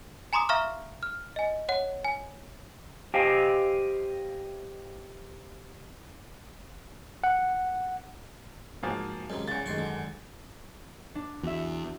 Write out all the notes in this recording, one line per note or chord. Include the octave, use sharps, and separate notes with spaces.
G#5 A#5 C6 D6 D#6
E5 F5 A#5 C#6 F6
F6
D#5 G#5
C#5 F#5
G#5
G4 C5 D#5 F5 G5 G#5
F#5
G#2 F3 A#3 F#4 G#4 A6
F#2 C3 D#3 G#3
E2 C#3 A6
A1 F#2 D#3 G#3 C6 C#6
D3
D4
E2 F#4 E5